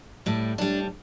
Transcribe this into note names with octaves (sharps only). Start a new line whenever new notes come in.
A2 G3
A2 G3 D4